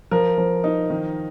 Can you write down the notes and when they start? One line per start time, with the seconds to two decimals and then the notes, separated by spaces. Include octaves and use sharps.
0.11 F3 A#4
0.38 F3
0.64 D#4
0.90 D#3